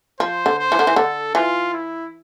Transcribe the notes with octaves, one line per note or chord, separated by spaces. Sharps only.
F3 C5
D3
C5
E3
D3
E3
D3 A4
E3 F4
E4